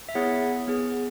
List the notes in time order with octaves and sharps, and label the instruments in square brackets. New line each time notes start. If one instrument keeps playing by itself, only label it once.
[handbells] E5
B3 E4 G#4 C#5 F#5
B3 G#4